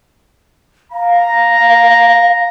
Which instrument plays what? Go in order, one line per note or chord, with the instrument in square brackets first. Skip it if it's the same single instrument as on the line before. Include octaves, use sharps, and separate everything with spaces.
[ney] F5 [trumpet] A#5